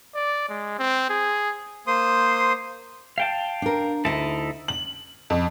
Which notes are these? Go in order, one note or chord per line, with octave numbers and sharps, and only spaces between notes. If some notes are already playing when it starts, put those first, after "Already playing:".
D5
G#3
C4
G#4
A#3 C5 C6 D#6
F5 G5 A5
D4 A#4
D2 D#4 E4 D#5 A5
F#7
F2